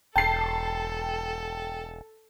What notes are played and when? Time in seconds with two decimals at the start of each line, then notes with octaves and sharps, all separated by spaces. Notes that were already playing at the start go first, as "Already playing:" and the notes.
0.16 E1 A4 G5 A5 C7